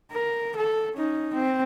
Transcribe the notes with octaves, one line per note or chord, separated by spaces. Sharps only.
A#4
A4
C#4 D#4
C4